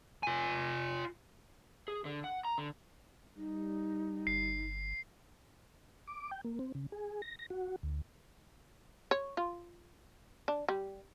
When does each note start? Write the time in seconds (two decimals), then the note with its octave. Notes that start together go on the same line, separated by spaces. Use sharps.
0.23 F4 G#5
1.88 G#4
2.05 D3
2.24 F#5
2.45 A#5
2.58 D3
3.37 G3 D#4
4.27 G1 C7
6.08 D6
6.31 G5
6.45 A#3
6.59 C4
6.75 C#3
6.92 G#4
7.22 A#6
7.39 A#6
7.50 F#4
7.83 D2
9.11 C#5
9.37 F4
10.48 D4
10.69 G3